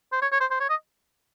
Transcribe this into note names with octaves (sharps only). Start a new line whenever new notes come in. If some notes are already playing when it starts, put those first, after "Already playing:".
C5
C#5
C#5
C5
C5
C#5
D#5